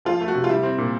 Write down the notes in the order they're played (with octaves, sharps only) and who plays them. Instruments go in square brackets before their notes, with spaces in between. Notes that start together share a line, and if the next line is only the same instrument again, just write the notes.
[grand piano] F3 [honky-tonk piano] F4
[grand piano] A3
[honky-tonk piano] F#4
[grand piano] C3
[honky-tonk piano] F4
[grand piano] G3 [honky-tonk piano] E4
[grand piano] C4
A#2